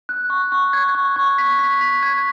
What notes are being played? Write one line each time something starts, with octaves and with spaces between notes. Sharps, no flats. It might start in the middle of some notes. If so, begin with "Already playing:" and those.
F#6
C#6
C#6
G#6
C#6
C#6
B6
B6
B6
G#6